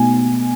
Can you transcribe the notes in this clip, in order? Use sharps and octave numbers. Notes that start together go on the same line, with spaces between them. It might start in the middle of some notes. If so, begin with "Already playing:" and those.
Already playing: B2 A3 D#4 G#5